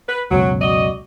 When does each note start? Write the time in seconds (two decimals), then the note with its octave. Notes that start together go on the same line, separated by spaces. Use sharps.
0.08 B4
0.31 C#2 F#2 B2 F#3
0.61 F#4 D5 D#5